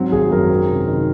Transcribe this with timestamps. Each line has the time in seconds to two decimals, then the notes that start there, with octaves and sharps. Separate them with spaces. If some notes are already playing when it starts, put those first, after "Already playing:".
Already playing: G#2 F#3 C4
0.12 G#1 G#4
0.31 F#2 A#4
0.50 C4
0.69 C3
0.88 D#3